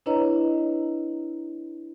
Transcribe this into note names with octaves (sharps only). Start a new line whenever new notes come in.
D4 E4 B4 C#5 D#5 A#5